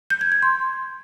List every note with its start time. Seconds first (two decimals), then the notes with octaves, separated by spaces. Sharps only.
0.10 G6
0.21 G#6
0.32 G#6
0.42 C6